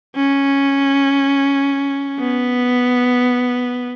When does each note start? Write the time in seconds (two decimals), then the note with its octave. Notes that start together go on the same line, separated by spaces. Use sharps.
0.16 C#4
2.19 B3